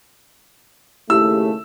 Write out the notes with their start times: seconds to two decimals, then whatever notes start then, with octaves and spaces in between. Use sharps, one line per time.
1.10 D#2 C#3 A3 E4 G4 E6